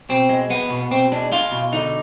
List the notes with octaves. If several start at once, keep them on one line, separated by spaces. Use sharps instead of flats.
B2 C4
G#3
G#3 B3
B2
B2 C4
G#3 D4
G#3 F4
B2
D3 D#4